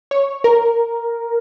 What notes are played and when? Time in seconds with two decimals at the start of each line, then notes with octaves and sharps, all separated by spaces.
0.11 C#5
0.44 A#4